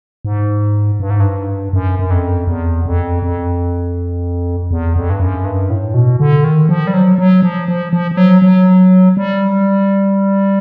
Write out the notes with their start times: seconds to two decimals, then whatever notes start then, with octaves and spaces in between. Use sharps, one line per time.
0.25 G#2
1.00 G2
1.10 G#2
1.20 G2
1.73 F#2
1.99 F#2
2.11 F2
2.47 E2
2.85 F2
3.23 F2
4.71 E2
4.96 F2
5.10 G2
5.20 F#2
5.45 G2
5.70 A2
5.94 B2
6.20 D3
6.44 D#3
6.69 F3
6.87 G3
6.94 F#3
7.18 F#3
7.42 F3
7.68 F3
7.93 F3
8.11 F3
8.17 F#3
8.42 F#3
9.17 G3